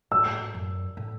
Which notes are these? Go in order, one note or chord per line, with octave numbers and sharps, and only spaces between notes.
A2 E6
F#2
A2